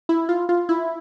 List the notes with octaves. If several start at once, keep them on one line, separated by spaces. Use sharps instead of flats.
E4
F4
F4
E4